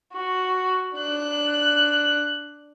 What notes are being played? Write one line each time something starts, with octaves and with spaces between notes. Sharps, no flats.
F#4
D4 F#6